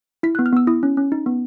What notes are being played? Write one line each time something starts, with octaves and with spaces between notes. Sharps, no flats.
E4 B6
F#6
B3
F6
B3 E6
E4 D#6
C#4
C#4
D#4
B3